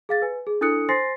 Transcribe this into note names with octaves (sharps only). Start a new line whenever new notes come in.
G#4 F5 A6
B4 G#5
G#4
D4 E4 A4 D#6 F#6 C#7
C5 G#5 C6 A6 A#6 C7